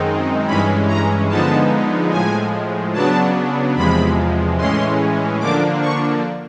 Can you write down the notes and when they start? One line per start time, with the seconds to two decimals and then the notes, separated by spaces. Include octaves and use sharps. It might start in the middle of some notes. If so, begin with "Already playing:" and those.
Already playing: F#2 D#3 G#3 C4 D#4
0.47 G2 E3 G#3 C#4 B5
0.88 A#5
1.29 D3 F3 G#3 B3 D#4 A5
2.11 A2 F3 G#3 G#5
2.94 C#3 F#3 B3 D4 A5
3.76 E2 C3 F3 G#3 B5
4.58 A2 E3 G#3 C#4 C6
5.40 D3 F3 A#3 D4 D6
5.81 C#6